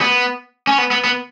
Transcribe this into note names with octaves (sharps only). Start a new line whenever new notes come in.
B3
C#4
B3
B3
B3